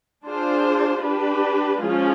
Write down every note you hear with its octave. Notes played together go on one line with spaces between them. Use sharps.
D4 F4 G#4 C5
D4 G4 B4
F3 G#3 C#4 F4 G#4